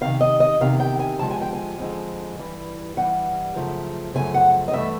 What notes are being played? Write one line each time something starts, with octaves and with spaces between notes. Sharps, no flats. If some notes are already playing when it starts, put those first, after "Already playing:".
E2 C3 D#3 F5
D#5
D#5
E2 C3 D#3 F5
G5
G#5
F2 D3 F3 G#3 A5
G#5
G5
G#5
F2 D3 F3 G#3
G2 E3 G3
G2 E3 G3 F#5
F#2 C#3 F3 A3
F#2 C#3 F3 A3 G#5
F#5
D#5
G2 E3 A3 E5